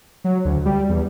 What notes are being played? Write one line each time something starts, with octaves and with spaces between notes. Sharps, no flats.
F#3
D2
G3
E2